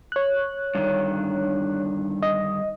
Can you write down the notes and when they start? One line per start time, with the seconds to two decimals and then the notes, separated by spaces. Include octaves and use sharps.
0.12 C#5 F#6
0.75 G2 D3 D#3
2.22 D#5